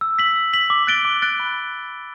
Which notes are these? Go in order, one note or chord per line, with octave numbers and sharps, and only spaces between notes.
E6
B6 F#7
E6
B6 F#7
D6
F#6 A6 D7 G7
D6
F#6 A6 D7 G7
B5